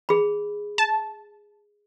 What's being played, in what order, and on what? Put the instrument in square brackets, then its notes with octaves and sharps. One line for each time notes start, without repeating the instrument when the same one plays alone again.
[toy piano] G#4 B5
[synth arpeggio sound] A5